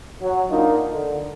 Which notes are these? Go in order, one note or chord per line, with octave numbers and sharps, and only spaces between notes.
F#3
A#3 D4 D#4 F4
D3